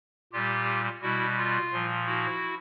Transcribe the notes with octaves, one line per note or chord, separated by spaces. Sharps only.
A#2 G3 F4 G4
B2 G3 E4 F#4
F4
A#2 F3
E4 F#4